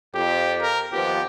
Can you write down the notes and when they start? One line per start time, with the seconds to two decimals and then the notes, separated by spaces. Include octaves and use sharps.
0.15 F2 G4
0.61 A#4
0.92 D#2 F3 B3 G4